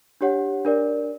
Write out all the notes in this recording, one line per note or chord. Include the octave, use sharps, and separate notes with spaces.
D4 G4 C#5 F#5
D4 A#4 D5